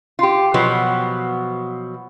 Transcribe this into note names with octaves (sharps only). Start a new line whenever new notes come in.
F4 G4
B2 F3 F#3 B3